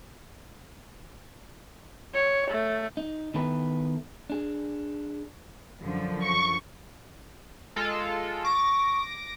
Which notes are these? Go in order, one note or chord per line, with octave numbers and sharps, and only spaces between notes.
C#5
A3
D#4
D#3 B3 E4 A4 B4
D4 G#4
F#2 D3 F3
C#6
G#3 F4 A4
C#6 D6 A#6